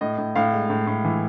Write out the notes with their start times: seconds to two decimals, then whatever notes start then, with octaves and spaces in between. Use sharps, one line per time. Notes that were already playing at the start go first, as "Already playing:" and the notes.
0.01 A2 D#5
0.18 A2
0.36 A2 F5
0.53 G#3
0.70 A2
0.87 A2
1.05 E3